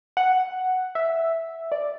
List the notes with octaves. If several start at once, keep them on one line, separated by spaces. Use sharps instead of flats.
F#5
E5
D5